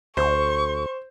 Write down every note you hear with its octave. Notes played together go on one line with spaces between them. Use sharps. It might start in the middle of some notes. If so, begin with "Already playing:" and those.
D2 C5 C#6